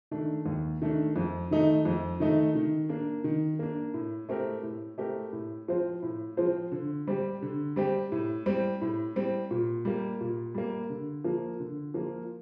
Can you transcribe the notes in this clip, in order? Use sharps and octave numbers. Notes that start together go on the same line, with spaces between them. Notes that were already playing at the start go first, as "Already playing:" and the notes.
D#3 A3 D4
D#2
D#3 A3 D4
F2
D#3 A3 D#4
F2
D#3 A3 D#4
D#3
A#3 D4
D#3
A#3 D4
A2
A3 C4 G4 A#4
A2
A3 C4 G4 A#4
A2
F3 C4 F4 C5
A2
F3 C4 F4 C5
D3
G3 C4 G4
D3
G3 C4 G4
A2
G3 C4
A2
G3 C4
A#2
G3 A#3
A#2
G3 A#3
D3
F3 A#3 F4
D3
F3 A#3 F4